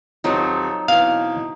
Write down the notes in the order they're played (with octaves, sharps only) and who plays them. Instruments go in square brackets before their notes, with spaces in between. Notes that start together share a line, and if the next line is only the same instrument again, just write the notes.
[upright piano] D#1 C4 D#5 [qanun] F#3 F4 C5 [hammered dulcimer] D#4
[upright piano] B2 E3 C4 [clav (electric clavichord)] F5